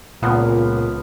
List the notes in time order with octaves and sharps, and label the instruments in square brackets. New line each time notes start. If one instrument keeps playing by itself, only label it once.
[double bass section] C#2 [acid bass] A#2 [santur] F3 B3 F5